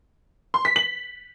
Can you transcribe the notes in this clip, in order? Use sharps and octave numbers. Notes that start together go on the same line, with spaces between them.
C6
B6
F#7